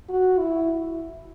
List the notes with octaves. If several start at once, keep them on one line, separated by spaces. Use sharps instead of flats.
F#4
E4